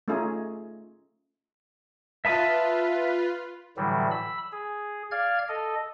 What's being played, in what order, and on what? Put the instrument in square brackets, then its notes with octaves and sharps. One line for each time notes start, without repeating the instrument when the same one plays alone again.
[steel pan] A3 C#4 D#4 F4 G#4
[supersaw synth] F4 B4 [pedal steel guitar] E5 A5 D#6
[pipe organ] A2 D3 E3 F#3 G3
B5 E6
G#4
D5 F5 F6 G#6
A4 D#5